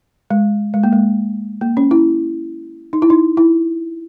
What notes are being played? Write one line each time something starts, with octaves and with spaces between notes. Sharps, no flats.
G#3
G#3
A#3
G#3
A#3
C#4
E4
D#4
E4
D#4
E4